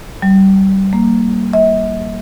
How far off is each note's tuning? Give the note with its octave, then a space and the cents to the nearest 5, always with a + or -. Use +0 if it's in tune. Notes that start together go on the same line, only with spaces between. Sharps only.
G3 -25
A#3 -5
E5 -45